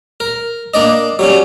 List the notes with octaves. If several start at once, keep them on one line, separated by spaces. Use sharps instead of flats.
A#4
A#3 D4 D5 D#5
F#3 G3 C#4